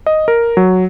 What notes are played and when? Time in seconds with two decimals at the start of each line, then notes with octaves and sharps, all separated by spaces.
0.06 D#5
0.28 A#4
0.57 F#3